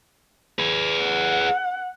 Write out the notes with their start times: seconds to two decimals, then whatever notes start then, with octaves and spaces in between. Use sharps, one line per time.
0.59 G#4 B4
1.05 F#5